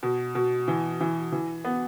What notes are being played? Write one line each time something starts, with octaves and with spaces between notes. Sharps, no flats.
B2
B2
E3
E3
E3
B3